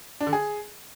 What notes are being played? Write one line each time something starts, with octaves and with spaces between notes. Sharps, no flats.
D4
D3
G#4